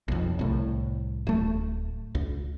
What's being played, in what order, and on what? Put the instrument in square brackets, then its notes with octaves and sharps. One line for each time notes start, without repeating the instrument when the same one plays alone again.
[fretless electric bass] B1 F2
C2 A2
D1 A3
C#2